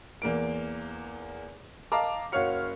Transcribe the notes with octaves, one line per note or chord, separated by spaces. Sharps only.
E2 A#3 D7
D#5 F5 A5 A#5 D6
F#1 F#4 C#5 F5 F6 C#7